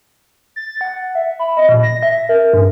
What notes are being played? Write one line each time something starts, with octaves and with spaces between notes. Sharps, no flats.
A6
F#5
E5
B5
D#5
A#2
A#6
E5
A#4
G2